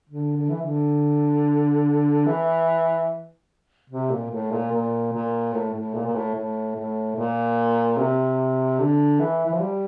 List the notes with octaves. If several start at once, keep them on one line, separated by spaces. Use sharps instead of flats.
D3
D3
E3
D3
E3
C3
A#2
A2
A#2
A#2
A#2
A2
A2
A#2
A#2
A2
A2
A2
A#2
C3
D3
E3
E3
F3
G3